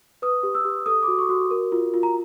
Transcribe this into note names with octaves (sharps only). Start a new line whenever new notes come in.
B4 D#6
G4
E6
G4
A4 D#6
D6
F#4
C#6
F#4
A#4
F4
F4
A#5